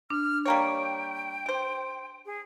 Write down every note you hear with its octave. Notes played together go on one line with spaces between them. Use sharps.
D4 F6
G3 A#3 C#5 G5
G4 C5
G#4